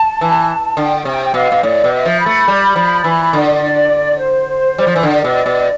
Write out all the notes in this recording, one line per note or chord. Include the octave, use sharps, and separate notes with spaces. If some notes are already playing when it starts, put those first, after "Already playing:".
Already playing: A5
E3
D3 G5
C3 G5
G5
B2 F5
B2
A2 D5
B2
E5
F3
B5
A3
G3
F3
E3
D3 D5
C5
G3
F3
E3
D3 D5
B2
B2